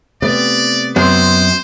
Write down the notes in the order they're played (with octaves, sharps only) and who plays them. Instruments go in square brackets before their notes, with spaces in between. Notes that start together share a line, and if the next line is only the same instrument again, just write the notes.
[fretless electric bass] C3 A3 [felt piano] B3 [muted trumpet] D5
[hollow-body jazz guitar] F#2 [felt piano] B3 C4 [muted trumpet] C5